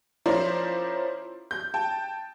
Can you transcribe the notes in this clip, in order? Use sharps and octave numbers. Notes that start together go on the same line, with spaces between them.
F3 C#4 E4 A#4 C5 D5
G6
G5 A5